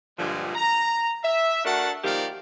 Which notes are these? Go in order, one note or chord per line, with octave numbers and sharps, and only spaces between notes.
G2 A#2 D3 F3 G3 G#3
A#5
E5
A3 D4 F#4 A#4 F#5 A5
D#3 F3 A#3 G4 A#4 D5